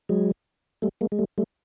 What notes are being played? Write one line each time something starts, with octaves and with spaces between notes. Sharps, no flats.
F#3 G#3
G3 A3
G#3 A#3
G#3
G3 A3
G3 A3